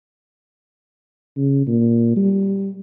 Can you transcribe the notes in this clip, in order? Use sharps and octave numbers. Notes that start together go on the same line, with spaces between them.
C#3
A#2
G3